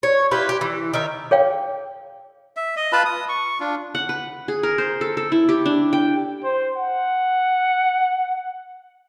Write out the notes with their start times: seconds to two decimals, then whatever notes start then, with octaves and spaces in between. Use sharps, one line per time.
0.03 C#5
0.31 E4 F4 G4 B4
0.49 G4
0.61 E3
0.93 D#3 A#4 E5
1.31 G#4 C#5 F5 G5
2.57 E5
2.76 D#5
2.92 F4 B4 A5 B5
3.05 D#6
3.29 C#6
3.60 D4 F4
3.95 F#5
4.09 B4
4.48 G#4
4.63 A#4
4.78 C5
5.01 A4
5.17 A4
5.32 E4
5.49 G4
5.66 D4
5.93 G5
6.43 C5
6.77 F#5